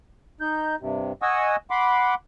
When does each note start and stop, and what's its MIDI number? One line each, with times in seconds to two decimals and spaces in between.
0.41 0.76 63
0.41 0.76 91
0.80 1.13 43
0.80 1.13 48
1.22 1.56 75
1.22 1.56 78
1.22 1.56 80
1.22 1.56 85
1.22 1.56 87
1.22 1.56 88
1.70 2.15 78
1.70 2.15 83
1.70 2.15 84
1.70 2.15 86